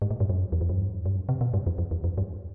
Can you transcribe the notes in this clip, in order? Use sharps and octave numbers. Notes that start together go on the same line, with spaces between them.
G#2
A2
G2
F#2
E2
F2
F#2
G2
G2
F#2
C3
B2
G2
F2
F2
E2
F2
G2